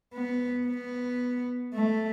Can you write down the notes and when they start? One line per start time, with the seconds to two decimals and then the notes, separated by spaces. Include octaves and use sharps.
0.14 B3
0.67 B3
1.74 A3